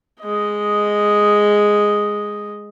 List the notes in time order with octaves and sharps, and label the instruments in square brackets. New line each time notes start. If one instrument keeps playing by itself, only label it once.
[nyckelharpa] G#3 D#5